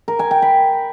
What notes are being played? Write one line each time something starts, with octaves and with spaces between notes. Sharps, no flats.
A#4
G#5
G5
B5